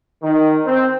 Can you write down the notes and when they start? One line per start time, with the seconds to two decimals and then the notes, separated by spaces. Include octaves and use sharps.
0.23 D#3
0.65 C4